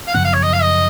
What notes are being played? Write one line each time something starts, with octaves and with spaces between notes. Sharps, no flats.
F5
F#2 C#3 F3 B3 F#5
F5
C#5
D#5
F5
D#5